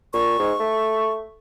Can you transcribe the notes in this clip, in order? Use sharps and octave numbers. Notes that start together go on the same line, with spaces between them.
A#2 C#6
G#2
A3